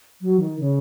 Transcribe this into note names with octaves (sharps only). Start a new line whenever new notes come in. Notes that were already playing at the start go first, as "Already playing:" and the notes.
F#3
D#3
C#3